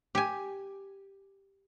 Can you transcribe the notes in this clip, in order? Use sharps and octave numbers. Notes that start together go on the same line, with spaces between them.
G4 G#5